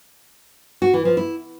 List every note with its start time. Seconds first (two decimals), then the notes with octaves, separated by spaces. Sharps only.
0.82 F#4
0.94 E3
1.05 F3
1.17 E4